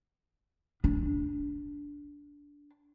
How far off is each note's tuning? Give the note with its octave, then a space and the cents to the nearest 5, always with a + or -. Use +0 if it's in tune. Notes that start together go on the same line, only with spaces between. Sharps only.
D4 -15